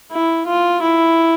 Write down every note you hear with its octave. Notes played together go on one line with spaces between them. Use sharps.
E4
F4
E4